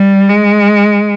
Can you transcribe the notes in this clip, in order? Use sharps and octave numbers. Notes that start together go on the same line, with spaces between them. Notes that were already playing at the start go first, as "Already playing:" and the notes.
Already playing: G3
G#3